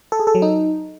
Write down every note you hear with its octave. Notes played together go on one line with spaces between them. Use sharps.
A4
G#4
A4
F#3
D#4